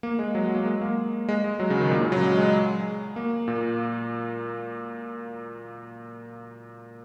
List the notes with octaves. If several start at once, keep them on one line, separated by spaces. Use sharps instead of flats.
A#3
G#3
F#3
G#3
A#3
G#3
A#3
G#3
G#3
F#3
C#3
D#3
A#2
C#3
F#3
G#3
G#3
A#3
A#2